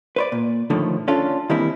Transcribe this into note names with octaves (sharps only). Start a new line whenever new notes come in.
B4 C5 D5
A#2
A2 D3 D#3 F3 A3
C#4 D4 F4 A4
D#3 E3 G3 A#3 C4 E4